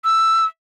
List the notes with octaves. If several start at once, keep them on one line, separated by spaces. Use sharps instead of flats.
E6